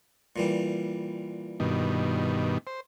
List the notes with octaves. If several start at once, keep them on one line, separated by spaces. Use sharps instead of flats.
A#2 E3 G3
G2 B2 D#3
C5